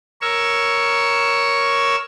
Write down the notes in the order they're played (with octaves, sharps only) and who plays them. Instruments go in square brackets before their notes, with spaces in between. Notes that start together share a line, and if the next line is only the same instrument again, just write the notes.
[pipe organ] A#4 C#5 C#6 E6